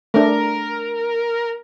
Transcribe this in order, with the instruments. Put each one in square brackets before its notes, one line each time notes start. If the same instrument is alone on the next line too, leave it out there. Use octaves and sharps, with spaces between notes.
[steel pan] A3 D4 [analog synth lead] A#4